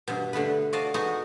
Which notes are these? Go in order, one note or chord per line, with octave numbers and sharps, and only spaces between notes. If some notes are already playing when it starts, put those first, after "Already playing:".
G2 B2
D3 A3 B3 B4
F#4 D5 D#5 F5 A5
G#3 B3 D#4 F#4